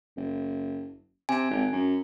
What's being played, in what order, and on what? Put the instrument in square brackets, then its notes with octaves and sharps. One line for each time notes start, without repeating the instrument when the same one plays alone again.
[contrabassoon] F#1
[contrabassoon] C3 [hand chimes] G#5
[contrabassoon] G#1
F#2